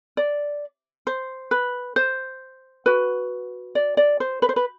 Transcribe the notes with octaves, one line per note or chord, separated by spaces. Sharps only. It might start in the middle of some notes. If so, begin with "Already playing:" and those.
D5
C5
B4
C5
F#4 B4
D5
D5
C5
B4
C5
B4